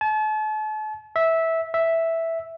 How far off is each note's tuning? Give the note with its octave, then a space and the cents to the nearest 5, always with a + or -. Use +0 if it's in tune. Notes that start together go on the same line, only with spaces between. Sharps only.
A5 -40
E5 -10
E5 +0